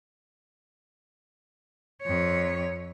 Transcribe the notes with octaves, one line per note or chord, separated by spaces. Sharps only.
F2 C#5